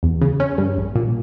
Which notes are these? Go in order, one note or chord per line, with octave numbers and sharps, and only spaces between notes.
E2
C#3
C#4
G2
A#1
A#2